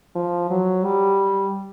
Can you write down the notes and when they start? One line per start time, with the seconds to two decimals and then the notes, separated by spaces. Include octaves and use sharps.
0.15 F3
0.50 F#3
0.84 G3